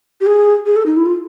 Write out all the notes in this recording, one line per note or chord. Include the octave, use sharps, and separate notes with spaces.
G4
G#4
G#4
A4
D#4
E4
F4